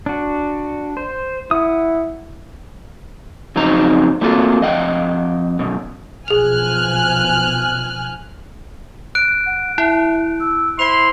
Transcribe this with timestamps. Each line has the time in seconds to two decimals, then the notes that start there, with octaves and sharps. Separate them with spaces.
0.06 D4 F#4
0.97 C5
1.51 E4 F#5 D#6
3.56 F2 C#3 F#3 C4 D#4 A#5
4.21 A3 A#3 C4 F4 F#4 A4
4.61 F2 D#5 F#5 G5
5.59 F#2 B2
6.28 B1 B2 F3 G#4 G#5 F6 F#6 F7
9.15 F#6 D7
9.46 F#5
9.78 E4 E5
10.40 E6
10.79 E4 C5 C6 F7